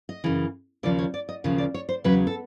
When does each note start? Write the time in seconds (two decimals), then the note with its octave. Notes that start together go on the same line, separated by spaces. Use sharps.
0.09 D#5
0.24 F#2 C#3 E3
0.83 D#2 C#3 F3 D5
0.99 C#5
1.14 D5
1.29 D#5
1.44 D#2 C#3 F3
1.58 D5
1.74 C#5
1.89 C5
2.04 E2 C#3 F#3 B4
2.27 A4